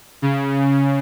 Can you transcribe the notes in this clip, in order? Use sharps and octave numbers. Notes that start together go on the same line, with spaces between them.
C#3